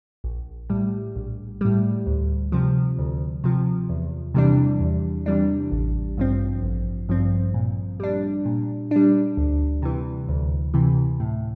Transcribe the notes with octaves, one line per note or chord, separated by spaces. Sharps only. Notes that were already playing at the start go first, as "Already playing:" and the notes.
A#1
A2 G3
A#1
A2 G3
D2
C3 F3
D2
C3 F3
E2
C3 E3 G3 D4
E2
C3 E3 G3 D4
A1
G2 F3 C4
A1
G2 F3 C4
A#2
G3 D4
A#2
G3 D4
D2
C3 E3
D2
C3 E3
A2